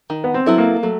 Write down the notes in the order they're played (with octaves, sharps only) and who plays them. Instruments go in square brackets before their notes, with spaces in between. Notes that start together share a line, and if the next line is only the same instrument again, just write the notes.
[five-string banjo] D#3
[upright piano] B3
C4
[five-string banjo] F#3 B3 E4 A4
[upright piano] A#3
[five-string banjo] F#3 [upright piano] A3